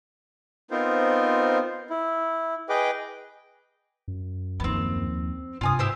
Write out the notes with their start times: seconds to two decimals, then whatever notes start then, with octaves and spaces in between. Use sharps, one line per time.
0.71 B3 C4 D#4 F4 A#4 C5
1.90 E4
2.69 G#4 B4 D#5 G5 D6
4.08 F#2
4.60 D#2 F3 B3 C4
5.61 G2 C3 F4 G#5 D#6
5.79 G#2 E4 G4 C5